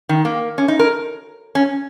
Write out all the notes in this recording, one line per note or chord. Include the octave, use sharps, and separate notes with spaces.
D#3
A#3
C#4
D#4
A#4
C#4